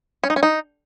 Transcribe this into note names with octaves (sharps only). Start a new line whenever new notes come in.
C#4
D#4
C#4
D#4